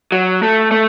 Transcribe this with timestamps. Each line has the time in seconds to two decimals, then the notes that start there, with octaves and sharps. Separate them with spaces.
0.12 F#3
0.43 A3
0.72 A3